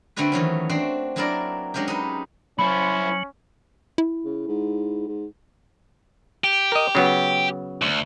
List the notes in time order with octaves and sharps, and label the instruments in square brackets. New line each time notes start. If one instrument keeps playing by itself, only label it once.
[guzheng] D3 A3 C4 D4 F#4 B4
D#3 E3 F#3 C#4
C4 D4 F#4 C6
F#3 A#3 D4 E4 A#4 D5
F#3 G#3 C#4 D4 G4
D#4 B4
[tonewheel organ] F#3 [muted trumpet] C#4 [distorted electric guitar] E4 C5 [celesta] B5
[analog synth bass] E4
[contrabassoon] C#3
G#2
G#2
[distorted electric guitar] G4
[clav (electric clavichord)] A#4 D#5
C#3 F#3 B3
[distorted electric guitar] D2